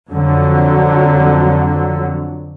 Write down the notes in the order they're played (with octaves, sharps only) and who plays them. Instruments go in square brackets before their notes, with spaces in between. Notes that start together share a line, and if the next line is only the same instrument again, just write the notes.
[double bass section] F2 D3 F#3